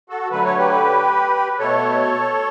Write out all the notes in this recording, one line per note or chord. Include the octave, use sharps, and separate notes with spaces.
F#4 A4
D3 F#3 A3 B4
C#5
G4 B4
B2 A3 A4 C#5